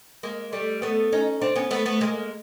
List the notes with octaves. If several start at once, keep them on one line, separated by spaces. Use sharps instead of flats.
G#3 A#3
G3 A3
A3 B3
C#4 D#4
C4 D4
B3 C#4
A3 B3
A3 B3
G#3 A#3